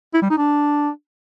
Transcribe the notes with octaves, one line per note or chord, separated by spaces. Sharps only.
E4
G3
D#4
D4